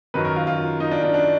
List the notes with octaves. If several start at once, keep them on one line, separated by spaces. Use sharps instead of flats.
F#2 D#3 F#3 B4
A#4
F4
F4
D#4
D4
D4
D4